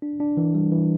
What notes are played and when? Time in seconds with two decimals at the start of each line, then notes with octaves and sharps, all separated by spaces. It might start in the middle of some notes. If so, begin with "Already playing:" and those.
0.02 D4
0.20 D4
0.37 E3
0.55 G3
0.72 E3